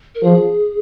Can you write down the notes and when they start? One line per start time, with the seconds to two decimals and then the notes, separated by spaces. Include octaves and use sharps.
0.15 A#4
0.23 F3 G#4